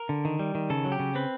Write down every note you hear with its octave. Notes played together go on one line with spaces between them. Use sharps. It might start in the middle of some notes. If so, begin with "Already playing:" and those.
Already playing: A#4
D3
D#3
G3
D#3
C#3 A4
F#3
G4
C#3
C4 B4